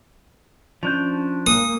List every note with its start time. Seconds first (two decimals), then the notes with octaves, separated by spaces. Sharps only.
0.83 F3 C#4 D4 G6
1.47 G#3 A#3 D#6